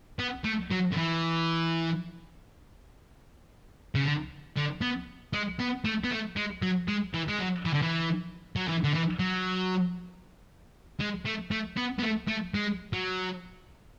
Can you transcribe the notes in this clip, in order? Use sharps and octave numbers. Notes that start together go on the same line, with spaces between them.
B3
A3
F#3
D3
E3
C#3
D3
D3
B3
G#3
B3
A3
B3
A3
G#3
F#3
G#3
E3
G#3
F#3
E3
D3
E3
F#3
E3
D3
E3
F#3
G#3
A3
A3
B3
B3
A3
A3
G#3
F#3